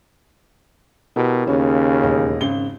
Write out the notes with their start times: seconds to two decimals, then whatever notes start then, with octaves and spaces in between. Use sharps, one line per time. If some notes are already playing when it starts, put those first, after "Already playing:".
1.16 B2 E4 G4 A#4
1.48 D#2 C#3 C#4
2.03 E1 D#5
2.41 G#1 C#3 G7